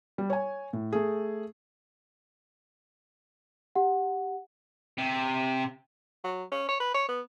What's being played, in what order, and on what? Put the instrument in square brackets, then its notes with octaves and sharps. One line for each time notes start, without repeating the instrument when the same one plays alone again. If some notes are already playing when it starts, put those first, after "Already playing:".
[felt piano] G3
C#5 G#5
A2
A3 G#4
[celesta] G4 F#5
[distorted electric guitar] C3
[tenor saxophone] F#3
C#4
C#5
B4
C#5
B3